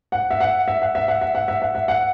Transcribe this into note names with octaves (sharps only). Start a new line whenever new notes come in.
F#5
E5
F#5
E5
F#5
E5
F#5
E5
F#5
E5
F#5
E5
F#5